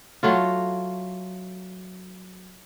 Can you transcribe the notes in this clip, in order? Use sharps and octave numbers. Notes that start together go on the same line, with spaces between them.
F#3 A3 F4